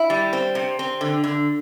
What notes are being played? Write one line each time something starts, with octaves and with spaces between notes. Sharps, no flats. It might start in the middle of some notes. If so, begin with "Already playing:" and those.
Already playing: E4
G3
C4
C3
C4
D3
D3